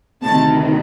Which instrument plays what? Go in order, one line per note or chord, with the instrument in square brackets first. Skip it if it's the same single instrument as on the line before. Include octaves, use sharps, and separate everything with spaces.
[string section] D2 C3 D#3 A5